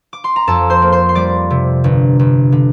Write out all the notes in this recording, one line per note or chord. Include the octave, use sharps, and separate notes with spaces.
D6
C6
A#5
F2 A4 A5
C5 C6
A#3
C5 C6
C6
G3 D5 D6
C3
G1
G1
D3